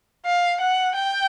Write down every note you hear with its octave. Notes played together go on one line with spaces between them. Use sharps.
F5
F#5
G5